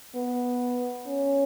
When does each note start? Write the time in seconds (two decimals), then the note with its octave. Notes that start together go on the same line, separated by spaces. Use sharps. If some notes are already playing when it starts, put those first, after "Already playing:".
0.15 B3
1.07 C#4